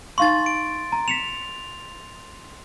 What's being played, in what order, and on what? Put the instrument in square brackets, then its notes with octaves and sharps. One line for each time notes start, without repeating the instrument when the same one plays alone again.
[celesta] D#4 F5 C#6 [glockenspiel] C6 A6
[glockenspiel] D7
[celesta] A#5
[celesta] B6 C#7 E7 [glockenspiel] F7